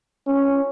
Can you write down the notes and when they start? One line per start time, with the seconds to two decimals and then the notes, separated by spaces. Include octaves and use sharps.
0.27 C#4